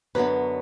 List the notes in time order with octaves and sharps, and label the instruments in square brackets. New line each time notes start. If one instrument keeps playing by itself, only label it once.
[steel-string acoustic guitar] F#2 D3 F#3 B3 B4